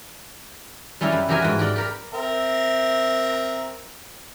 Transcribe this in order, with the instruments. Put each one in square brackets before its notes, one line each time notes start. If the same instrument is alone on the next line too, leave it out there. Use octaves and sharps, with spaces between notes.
[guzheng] G3 C#4 E4 G4 A#4
F#2
E3 F#3 G4 A#4 E5 G#5
G#2 F#4
G4 A#4 D5 G5
G4 A#4 B5
[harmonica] C4 A#4 E5